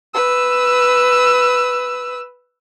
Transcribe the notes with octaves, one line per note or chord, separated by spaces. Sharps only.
B4 E6